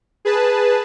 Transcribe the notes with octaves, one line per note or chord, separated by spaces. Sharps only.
G#4 B4 A5